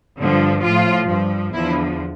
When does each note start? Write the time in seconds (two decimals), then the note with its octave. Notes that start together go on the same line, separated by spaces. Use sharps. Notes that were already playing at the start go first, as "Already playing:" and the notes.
0.18 G2 D3 F3
0.63 A2 F3 F4
1.08 G2 F3
1.54 E2 D3 F3 E4